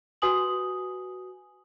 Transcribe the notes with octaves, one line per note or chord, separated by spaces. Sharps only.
F#4 B4 G#5 D#6 F#7